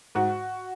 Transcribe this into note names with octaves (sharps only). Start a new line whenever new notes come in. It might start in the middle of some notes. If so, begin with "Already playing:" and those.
G#2 F#4